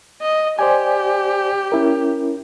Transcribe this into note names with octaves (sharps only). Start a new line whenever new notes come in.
D#5
G4 C5 D5 G#5
C#4 E4 A#4